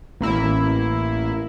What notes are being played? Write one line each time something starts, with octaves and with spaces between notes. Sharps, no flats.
A1 A#3 E4